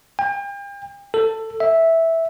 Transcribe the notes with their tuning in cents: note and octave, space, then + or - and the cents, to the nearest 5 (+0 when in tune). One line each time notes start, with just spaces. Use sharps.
G5 +40
A4 +15
E5 -5